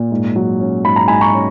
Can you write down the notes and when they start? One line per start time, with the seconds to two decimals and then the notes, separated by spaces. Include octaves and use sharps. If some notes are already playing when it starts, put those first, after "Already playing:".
Already playing: A#2
0.11 G#2
0.36 F#3
0.60 C#4
0.84 G#2 B5
0.96 A#5
1.08 G#2 G#5 B5
1.21 A#5 C#6
1.34 C#4